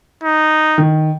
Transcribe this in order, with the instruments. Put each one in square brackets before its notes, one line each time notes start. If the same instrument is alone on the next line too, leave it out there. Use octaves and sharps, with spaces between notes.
[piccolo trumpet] D#4
[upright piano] D#3